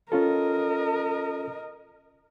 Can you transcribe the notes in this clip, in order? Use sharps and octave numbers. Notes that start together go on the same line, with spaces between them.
C#4 F4 A4 A#4 D#5